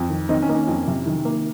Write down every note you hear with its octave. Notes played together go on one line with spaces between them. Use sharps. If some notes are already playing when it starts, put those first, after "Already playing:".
Already playing: F2
D#3
D#3 C4 D#4
C#4
A#3 D#4
C#4
F2
C3
D#3
A#3